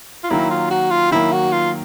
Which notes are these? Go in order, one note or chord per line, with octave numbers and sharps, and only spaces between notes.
F4
D#3 F#3 A#3 E4
F4
F#4
F4
D#3 F#3 A#3 E4
F#4
F4